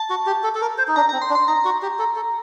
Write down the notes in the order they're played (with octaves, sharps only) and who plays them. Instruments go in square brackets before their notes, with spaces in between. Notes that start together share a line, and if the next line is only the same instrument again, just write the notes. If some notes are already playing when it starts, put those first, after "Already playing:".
Already playing: [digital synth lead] A5
[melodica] F#4
G4
A4
A4
A#4
C5
D#4
[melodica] D4 [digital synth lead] A#5
[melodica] C4 [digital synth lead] A#5
[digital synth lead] C6
[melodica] D4
[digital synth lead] C6
[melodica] D#4 [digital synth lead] A#5
[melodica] F#4
G4
A4
A4